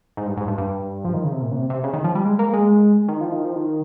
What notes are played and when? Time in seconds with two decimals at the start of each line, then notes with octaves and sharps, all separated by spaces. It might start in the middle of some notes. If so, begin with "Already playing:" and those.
0.17 G#2
0.27 G2
0.37 G#2
0.48 G2
0.58 G2
1.05 F3
1.14 D#3
1.24 C#3
1.32 C3
1.42 A#2
1.52 C#3
1.56 C3
1.70 C3
1.84 C#3
1.93 D#3
2.04 F3
2.15 G3
2.25 G#3
2.39 A#3
2.53 G#3
3.08 D#3
3.21 F3
3.32 D#3
3.45 F3
3.56 D#3